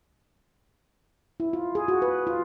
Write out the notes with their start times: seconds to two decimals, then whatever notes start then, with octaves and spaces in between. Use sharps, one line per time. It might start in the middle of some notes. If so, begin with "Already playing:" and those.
1.40 E4
1.53 F4
1.75 G#4
1.88 F#4
2.02 B4
2.27 F4